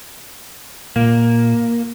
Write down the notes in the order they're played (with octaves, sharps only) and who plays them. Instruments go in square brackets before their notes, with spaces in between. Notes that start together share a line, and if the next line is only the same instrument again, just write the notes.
[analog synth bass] A#2 [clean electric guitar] A#3